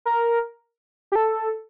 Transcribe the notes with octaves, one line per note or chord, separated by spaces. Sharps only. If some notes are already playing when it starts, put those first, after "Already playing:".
A#4
G4
A4